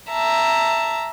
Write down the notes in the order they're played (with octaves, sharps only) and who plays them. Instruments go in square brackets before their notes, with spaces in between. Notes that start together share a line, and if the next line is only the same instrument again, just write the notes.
[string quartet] E5 A5 A#5